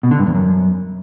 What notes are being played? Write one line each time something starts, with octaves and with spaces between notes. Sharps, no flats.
B2
D3
G2
E2
F#2